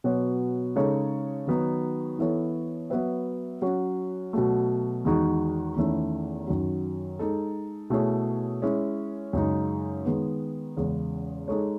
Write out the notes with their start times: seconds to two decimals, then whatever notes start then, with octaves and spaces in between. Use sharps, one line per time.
0.04 B2 F#3 B3 F#4 C#5
0.76 C#3 G#3 D#4 A4 C#5
1.47 D#3 F#3 B3 D#4
2.19 E3 B3 E4 A4 C#5
2.90 F#3 B3 F#4 B4 E5
3.62 F#3 C#4 F#4 C#5
4.33 B2 F#3 A3
5.05 E2 D#3 G#3 D#4 F#4
5.76 E2 D#3 A3 C#4 E4
6.47 F#2 D#3 F#3
7.19 G#3 D#4 A4
7.90 B2 A3 E4 G#4 C#5
8.62 G#3 C#4 E4
9.33 F#2 C#3 G#3 D#4
10.05 D#3 G#3 B3
10.77 E2 C#3 G#3 C#4
11.48 G#3 D#4 A4 C#5